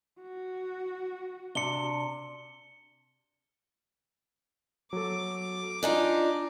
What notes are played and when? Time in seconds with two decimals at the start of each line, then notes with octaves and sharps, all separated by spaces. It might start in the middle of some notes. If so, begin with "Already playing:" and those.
0.21 F#4
1.55 C3 D4 C#7 G7
4.93 F#3 A4 D6
5.83 D4 D#4 F4 D#5 G#5 A#5